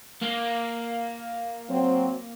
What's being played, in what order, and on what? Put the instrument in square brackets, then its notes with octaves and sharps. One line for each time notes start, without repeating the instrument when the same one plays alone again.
[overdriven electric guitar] A#3
[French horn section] F#3 C4